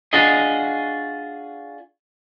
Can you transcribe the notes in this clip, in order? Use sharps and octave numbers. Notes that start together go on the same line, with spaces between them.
D4 F4 F#4 G#4 D#5